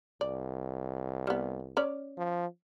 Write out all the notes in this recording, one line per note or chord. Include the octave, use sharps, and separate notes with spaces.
C2 D5
G3 B3
C#4 C#5 D5
F3